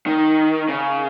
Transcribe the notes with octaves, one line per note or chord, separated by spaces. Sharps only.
D#3
C#3